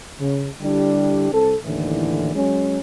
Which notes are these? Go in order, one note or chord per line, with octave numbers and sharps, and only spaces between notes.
C#3
D3 G3 D4 E4 G4
C2 C4 A4
D#2 A2 D3 E3
F#3 G#3 C#4